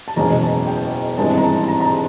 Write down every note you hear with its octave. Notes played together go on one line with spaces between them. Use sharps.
A5
F#1 E2 B2 G#3 C#4 A#5
A5
G5
G#1 G2 E3 G#3 C4 A5
A#5
A5
A#5
A#5
A5